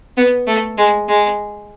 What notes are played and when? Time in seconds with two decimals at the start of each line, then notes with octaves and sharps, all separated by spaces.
0.17 B3
0.47 A3
0.78 G#3
1.08 G#3